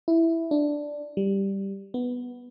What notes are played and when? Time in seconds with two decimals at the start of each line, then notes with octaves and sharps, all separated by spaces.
0.08 E4
0.51 D4
1.17 G3
1.94 B3